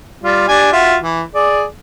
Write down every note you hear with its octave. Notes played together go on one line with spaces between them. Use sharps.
G3 F4
D4 G4 G#5
F4 F#4 E5
E3
G#4 D5